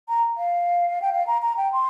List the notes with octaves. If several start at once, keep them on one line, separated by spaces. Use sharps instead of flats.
A#5
F5
G5
F5
A#5
A#5
G5
C6